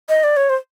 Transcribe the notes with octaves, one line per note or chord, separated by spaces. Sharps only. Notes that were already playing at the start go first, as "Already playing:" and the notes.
D#5
D5
C#5
C5